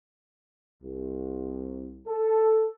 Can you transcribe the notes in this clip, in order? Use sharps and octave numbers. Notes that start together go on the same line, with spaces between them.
C2
A4